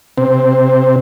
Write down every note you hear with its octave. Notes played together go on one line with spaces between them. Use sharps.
C3 C4